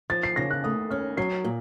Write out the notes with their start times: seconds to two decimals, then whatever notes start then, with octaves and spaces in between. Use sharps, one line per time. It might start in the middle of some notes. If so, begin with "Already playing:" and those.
0.10 F3 A6
0.23 C7
0.36 C#3 A#6
0.51 F#6
0.64 A3 D#6
0.90 C#4 F6
1.17 F#3 C7
1.44 A#2